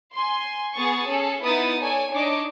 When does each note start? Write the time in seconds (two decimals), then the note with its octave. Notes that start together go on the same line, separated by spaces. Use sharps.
0.14 G#5 C6
0.77 B3 G#4 C#6 D#6 A6
1.07 C#4 G#4 A4
1.44 B3 D#4 E4 B4 D#6 A6
1.81 A4 C#5 D5 G#5
2.11 D4 D#4 C#5 D#5 D6